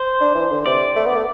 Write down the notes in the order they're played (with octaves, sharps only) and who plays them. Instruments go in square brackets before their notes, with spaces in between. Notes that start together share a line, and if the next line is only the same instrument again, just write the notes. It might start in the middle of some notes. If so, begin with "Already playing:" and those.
Already playing: [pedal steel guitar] C5
[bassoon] D4
E3
D3
[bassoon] C3 [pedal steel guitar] D5
[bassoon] A3
B3
A3